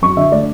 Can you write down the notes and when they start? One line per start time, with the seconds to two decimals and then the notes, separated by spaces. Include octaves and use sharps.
0.02 F#2 C#6
0.17 D3 E5
0.32 A3 D5